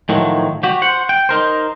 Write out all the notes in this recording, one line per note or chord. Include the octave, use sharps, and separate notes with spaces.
A2 D#3 F3 F#3
F#4 G4
C5 F#5
G5
D#4 A#4 C5